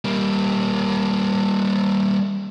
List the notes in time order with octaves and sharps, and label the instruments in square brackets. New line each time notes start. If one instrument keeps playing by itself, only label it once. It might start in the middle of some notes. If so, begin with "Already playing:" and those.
[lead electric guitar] G3 A#3